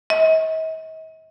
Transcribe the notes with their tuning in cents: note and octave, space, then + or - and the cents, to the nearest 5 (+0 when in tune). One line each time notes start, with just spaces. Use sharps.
D#5 +45